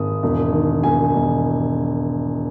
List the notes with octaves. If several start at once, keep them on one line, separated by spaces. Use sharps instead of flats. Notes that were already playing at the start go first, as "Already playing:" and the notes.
Already playing: G#1 D#6
E1
D#3
E1 G#5
E1